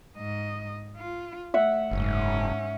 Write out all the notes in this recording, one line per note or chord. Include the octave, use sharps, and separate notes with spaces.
G#2 D#5
F4
A3 E5 F#5
F#1 G#2 C#4